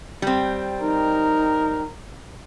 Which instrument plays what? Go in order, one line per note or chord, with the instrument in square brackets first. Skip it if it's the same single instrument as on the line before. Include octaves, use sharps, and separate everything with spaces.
[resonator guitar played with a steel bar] G3 C4
[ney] D#4 [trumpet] A#4